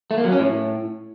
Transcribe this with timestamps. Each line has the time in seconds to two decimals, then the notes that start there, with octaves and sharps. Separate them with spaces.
0.11 A3
0.18 A#3
0.25 F#3
0.32 C#4
0.39 A2